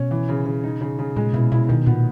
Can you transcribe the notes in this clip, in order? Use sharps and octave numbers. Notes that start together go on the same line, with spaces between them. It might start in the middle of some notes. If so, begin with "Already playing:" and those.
Already playing: B2 C#4
E3
C#3
C#3
D#4
C#3
C#3
A#2 G#3
B2 E4
B2 E4
B2 D#3
A#2 B3